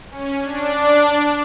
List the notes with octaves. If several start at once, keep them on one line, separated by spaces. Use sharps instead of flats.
C#4
D4